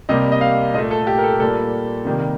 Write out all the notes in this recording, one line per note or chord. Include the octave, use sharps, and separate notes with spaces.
C3 G3 A#3 D#5
D#5
F5
A#2 A3 D#5
A4
G4
A#4
A4
A#2 G3 A#3 A4
C3 D#3 G3 A#3